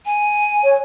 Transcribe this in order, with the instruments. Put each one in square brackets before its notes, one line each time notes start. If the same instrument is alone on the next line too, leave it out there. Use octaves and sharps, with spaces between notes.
[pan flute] G#5
[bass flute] C#5